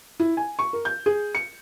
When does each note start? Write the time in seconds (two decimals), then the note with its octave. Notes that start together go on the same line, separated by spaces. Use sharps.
0.20 E4
0.37 G#5
0.59 C#6
0.73 A#4
0.85 G6
1.06 G#4
1.35 C#7